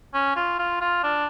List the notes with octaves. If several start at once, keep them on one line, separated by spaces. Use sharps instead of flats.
C#4
F4
F4
F4
D4